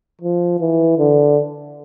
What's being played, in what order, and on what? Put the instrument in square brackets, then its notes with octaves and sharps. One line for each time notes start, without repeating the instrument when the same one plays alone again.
[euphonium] F3
E3
D3